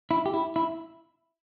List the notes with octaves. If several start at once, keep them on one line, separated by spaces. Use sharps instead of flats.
E4
G4
E4
E4